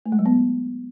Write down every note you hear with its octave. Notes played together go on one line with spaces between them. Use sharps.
A3
G#3
F#3
B3